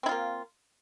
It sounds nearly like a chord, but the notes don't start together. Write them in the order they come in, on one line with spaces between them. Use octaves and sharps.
C4 E4 F4 A#3